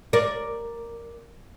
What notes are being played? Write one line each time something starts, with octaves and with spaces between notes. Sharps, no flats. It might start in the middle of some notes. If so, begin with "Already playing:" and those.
A#4 D5